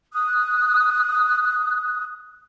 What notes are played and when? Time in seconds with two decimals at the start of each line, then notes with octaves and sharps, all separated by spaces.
0.13 D#6 F#6